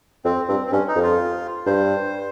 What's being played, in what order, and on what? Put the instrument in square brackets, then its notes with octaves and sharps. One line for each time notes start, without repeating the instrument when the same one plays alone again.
[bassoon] F2 [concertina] C4
[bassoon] G2 [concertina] C4
[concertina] C4
[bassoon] G2 [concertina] C#4
[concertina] D#4
[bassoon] F2
[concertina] F4
[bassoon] G2 [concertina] C5